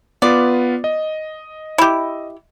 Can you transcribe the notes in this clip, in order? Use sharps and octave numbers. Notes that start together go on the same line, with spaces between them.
B3 F4 B4 D5
D#5
E4 G4